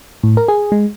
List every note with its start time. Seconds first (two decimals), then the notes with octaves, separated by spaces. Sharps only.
0.23 A2
0.37 A#4
0.48 G#4
0.72 G#3